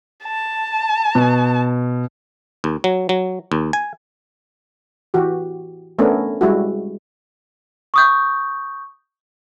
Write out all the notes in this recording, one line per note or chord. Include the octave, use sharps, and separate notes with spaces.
A5
B2
D#2
F#3
F#3
D#2
G#5
E3 F#4 G4
A3 B3 C#4 D4 A#4
G3 G#3 E4 F#4
C#6 D#6 G6